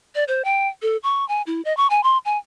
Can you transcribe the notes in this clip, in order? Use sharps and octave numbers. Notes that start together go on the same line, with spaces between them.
D5
C5
G5
A4
C#6
G#5
E4
D#5
C#6
G#5
C6
G#5